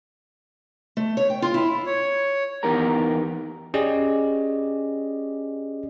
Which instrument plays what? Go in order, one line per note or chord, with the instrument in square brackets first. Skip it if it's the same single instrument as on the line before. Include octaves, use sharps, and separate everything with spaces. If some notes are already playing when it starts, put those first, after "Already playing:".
[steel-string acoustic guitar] A3
C#5
G5
F4
E4
[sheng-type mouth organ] C#5
[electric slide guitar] E2 B3 D#4 G4 A#4 A#5
[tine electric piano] C#4 G4 G#4 D5 D#5